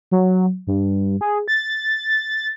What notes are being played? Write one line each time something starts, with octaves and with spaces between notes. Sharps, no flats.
F#3
G2
G#4
A6